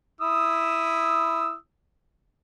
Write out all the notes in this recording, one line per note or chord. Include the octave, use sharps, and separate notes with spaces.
E4 D#6 E6